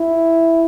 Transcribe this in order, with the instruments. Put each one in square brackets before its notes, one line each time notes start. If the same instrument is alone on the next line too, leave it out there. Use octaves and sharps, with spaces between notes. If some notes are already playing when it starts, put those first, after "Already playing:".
Already playing: [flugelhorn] E4